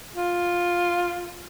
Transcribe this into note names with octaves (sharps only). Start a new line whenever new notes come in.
F4